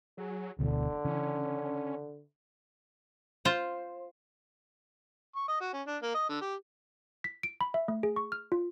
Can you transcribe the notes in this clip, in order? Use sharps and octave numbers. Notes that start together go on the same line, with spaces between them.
F#3 G#4
E1 D2 B2 D3 E3
C#3 E3 C#4
F4 C5
C#6
D#5
F#4
C#4
D4
A#3
D#5
D3
G4
B6
D7
B5
E5
A3
G#4
C#6
F6
F4